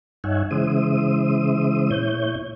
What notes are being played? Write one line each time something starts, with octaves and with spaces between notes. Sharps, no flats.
G2 D#4 C#5 E5 F#5 G#5
C#3 E3 G#3 C5 E5 D#6
A#2 E4 C#5 G6